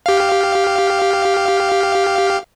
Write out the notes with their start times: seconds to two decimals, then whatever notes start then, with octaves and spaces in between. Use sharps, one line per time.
0.06 G4 F5